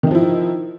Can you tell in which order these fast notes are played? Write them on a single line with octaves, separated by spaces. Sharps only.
D#3 D#4 F3 E4